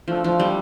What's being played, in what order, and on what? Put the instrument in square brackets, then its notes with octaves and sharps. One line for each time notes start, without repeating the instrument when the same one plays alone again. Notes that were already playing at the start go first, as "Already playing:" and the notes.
[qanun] F3 [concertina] A3 D4 A4
[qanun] F3
G3